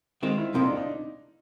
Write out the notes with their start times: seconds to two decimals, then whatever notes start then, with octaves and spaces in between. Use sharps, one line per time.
0.22 D#3 G#3 C4 F4
0.38 E4
0.54 F2 C3 F3 A#3 D#4
0.65 D4
0.76 D#4